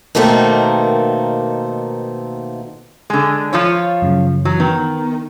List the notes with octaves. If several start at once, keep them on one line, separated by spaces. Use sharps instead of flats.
B2 D#3 A3 A#3 C4
D3 G#3
F3 F4 C#5
F#2 C#3
E3 F#3
D#3 B3